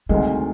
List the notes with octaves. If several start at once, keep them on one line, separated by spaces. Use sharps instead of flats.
D2 C3 D#3 G3 G#3